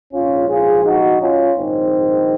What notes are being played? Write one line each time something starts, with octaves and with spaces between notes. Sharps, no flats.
A#1 G#2 F3 C#4 F4
F4 G#4
D#4 F#4
C#4 F4
A#1 G#2 D#3 C4 D#4